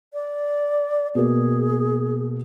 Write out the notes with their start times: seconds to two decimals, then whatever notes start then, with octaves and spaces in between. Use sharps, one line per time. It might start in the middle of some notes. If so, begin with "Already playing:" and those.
0.13 D5
1.15 B2 A#3 G#4